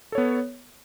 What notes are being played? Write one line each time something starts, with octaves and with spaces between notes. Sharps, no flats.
B3 A4 C#5